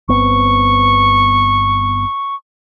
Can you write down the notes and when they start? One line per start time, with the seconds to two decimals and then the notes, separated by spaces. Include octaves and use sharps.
0.09 G1 B3 C4 C#6